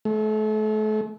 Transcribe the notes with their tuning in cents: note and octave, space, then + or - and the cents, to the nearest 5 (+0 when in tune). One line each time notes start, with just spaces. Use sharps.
A3 -35